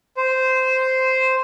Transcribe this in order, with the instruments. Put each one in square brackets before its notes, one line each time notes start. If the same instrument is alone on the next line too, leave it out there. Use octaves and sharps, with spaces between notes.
[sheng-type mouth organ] C5